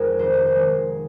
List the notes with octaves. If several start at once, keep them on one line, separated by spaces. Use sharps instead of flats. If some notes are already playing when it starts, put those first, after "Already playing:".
Already playing: F2 D#3 G#3 G#4 A#4
F1 C5
A#4
C5
D#3 G#3